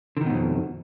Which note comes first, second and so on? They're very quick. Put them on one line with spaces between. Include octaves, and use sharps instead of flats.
D3 D#3 B2 G#2 F2